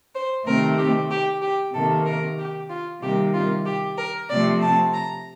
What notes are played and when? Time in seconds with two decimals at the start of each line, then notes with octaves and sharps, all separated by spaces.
0.14 C5
0.46 C3 D#3 A3 C4 A#4
0.78 G4
1.10 G4
1.41 G4
1.74 C3 D#3 A#3 A4
2.05 A#4
2.38 G4
2.69 F4
3.01 C3 D#3 G3 A#3 G4
3.33 F4
3.65 G4
3.97 A#4
4.29 C3 F3 A3 C4 D5
4.61 A5
4.93 A#5